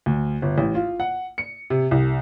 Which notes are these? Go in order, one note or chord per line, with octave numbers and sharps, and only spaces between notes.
D2
G1
A1
F4
F#5
C#7
C3
C2